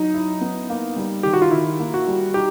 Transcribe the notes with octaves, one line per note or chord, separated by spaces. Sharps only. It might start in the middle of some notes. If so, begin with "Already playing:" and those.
Already playing: F#3 D#4
E4
B3
A#3
G3
D#3 G4
F#4
F4
D#3 E4
A#3
F#4
G3
D#4 G4